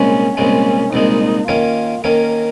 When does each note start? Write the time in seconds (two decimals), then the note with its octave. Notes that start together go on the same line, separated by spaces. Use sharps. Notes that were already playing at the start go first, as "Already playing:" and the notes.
Already playing: C2 A#2 G#3 C#4
0.37 C2 A#2 G#3 C#4
0.92 C2 A#2 G#3 D#4
1.48 D#3 A#3 C#4 F4
2.04 D#3 A#3 C#4 A#4